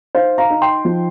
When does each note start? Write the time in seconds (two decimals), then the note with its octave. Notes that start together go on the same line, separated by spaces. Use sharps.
0.15 D#4 C5 F5
0.38 F5 A#5
0.50 D#4
0.62 G5 C6
0.85 F3